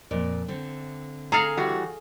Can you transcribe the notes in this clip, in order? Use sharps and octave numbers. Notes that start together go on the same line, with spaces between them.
F2 A#2 D5
D3 A3 C4
G#4 A4 F5 A#5
E3 G3 F#4